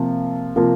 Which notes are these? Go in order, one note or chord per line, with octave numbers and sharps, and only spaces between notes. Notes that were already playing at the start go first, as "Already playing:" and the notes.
Already playing: C3 F3 A#3 F4
C3 F3 A#3 F4